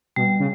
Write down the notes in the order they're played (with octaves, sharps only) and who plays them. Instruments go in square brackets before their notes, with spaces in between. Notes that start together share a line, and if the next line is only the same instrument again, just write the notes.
[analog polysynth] B2 [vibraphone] G3
[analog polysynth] C#3